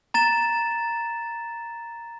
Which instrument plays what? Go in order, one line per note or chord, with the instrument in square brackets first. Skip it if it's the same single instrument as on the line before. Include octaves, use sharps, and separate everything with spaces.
[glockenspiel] A#5 A6 E7